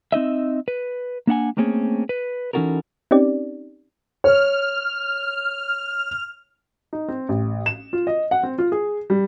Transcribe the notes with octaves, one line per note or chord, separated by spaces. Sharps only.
C4 D#4 D#5 E5
B4
A#3 D4 F#5 G#5
A3 A#3 C4 C#4 G#4
B4
E3 C#4 D#4 F#4 A4 A#4
C4 C#4 D#4 G4 D5
C#5 F6
D#4
C4
A1
E7
F4
D#5
F#5
C4
F4
G#4
G3